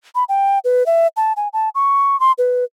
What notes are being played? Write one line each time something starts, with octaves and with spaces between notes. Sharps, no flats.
B5
G5
B4
E5
A5
G#5
A5
C#6
C6
B4